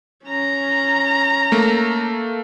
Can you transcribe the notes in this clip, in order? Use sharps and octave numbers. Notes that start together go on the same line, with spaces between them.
C#4 A#5
A3 A#3